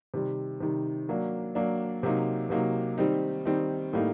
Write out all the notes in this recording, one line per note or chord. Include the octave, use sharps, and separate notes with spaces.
C3 D#3 G3
C3 D#3 G3
F#3 A#3 D4
F#3 A#3 D4
C3 F#3 A#3 D#4
C3 F#3 A#3 D#4
D#3 G3 C4 D#4
D#3 G3 C4 D#4
A2 G3 A#3 D#4